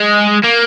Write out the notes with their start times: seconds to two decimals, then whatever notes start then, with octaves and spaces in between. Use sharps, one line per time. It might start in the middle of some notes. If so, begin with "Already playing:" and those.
Already playing: G#3
0.43 A#3